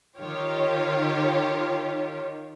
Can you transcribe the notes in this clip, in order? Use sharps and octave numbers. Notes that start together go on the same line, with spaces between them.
D#3 F4 G4 C#5